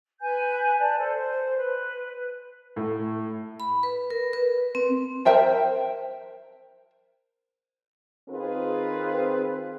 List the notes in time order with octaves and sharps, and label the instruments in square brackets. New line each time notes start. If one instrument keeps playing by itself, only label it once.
[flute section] B4 G#5 G6
D5 A5
A4 C5
C5
B4
[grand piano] A2
[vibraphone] B5
B4
A#4
B4
C4
[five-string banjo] A#4 C5 E5 G5 A5
[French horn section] D#3 C4 F4 G#4 B4